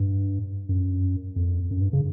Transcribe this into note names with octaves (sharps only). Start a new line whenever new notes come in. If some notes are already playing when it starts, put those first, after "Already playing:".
Already playing: G2
F#2
F2
F#2
G2
C#3